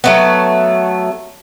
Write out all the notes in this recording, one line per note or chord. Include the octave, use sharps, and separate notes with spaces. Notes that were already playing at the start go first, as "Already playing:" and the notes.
F#3 A3 B3